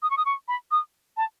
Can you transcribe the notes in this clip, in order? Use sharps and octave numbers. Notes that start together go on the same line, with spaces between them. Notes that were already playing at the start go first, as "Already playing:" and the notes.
D#6
C#6
D#6
C#6
B5
D#6
A5